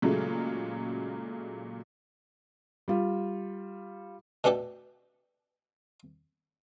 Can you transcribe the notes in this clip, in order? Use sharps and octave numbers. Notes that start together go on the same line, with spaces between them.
A#2 C#3 F#3 G#3 A3
G3 F4
B2 A3 D4 G4 A4